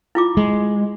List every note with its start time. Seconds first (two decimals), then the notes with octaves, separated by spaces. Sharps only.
0.15 E4 F4 D6
0.37 G#3